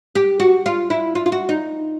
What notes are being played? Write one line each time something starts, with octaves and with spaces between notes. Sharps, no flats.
G4
F#4
F4
E4
F4
F4
F#4
D#4